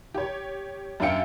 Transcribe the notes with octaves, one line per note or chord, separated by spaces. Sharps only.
G4 C#5
F#2 D4 F5 G5 C#7